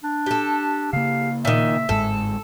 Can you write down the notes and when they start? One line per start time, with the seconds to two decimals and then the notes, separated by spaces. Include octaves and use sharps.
0.04 D4
0.26 G4 A4
0.93 C#3 A#3 F5
1.45 A#2 D#3 E5
1.89 G1 G#2 G#3 A4